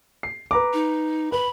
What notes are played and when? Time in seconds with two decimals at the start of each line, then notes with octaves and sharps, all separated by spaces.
0.23 C7
0.51 B4 A#5 D6
0.74 D#4
1.32 B4 B5